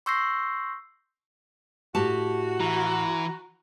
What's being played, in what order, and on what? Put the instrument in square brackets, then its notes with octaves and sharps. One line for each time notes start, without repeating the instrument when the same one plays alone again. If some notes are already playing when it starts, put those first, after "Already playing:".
[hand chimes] C6 C#6 E6 G6 A#6 C7
[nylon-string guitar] A2 G4 A5 [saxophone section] F#4
[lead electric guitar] E3 [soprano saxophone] A#5